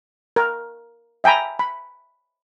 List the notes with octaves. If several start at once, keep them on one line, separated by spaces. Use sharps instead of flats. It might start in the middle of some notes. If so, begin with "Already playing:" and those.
A#4
E5 G5 G#5 A#5 B5
B5